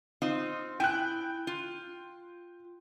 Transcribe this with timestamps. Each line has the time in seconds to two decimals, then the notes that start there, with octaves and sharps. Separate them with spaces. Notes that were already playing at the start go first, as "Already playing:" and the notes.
0.22 C4 D#4 F4
0.80 E4 G5 G#5 F#6
1.47 F4